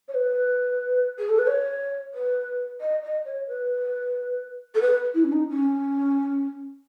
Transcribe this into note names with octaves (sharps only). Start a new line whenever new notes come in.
C#5
B4
G#4
A4
B4
C#5
B4
D#5
D#5
C#5
B4
A4
B4
E4
C#4
D#4
C#4